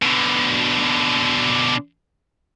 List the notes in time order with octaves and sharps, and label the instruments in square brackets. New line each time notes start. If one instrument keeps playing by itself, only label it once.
[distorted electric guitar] B2 D3